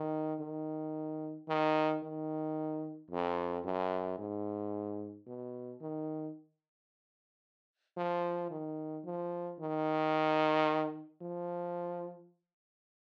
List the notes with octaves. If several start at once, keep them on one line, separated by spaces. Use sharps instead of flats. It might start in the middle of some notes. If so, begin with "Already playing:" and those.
Already playing: D#3
D#3
D#3
D#3
F2
F#2
G#2
B2
D#3
F3
D#3
F3
D#3
F3